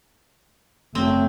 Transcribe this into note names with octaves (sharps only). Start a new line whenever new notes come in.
F#1 F#3 A3 C4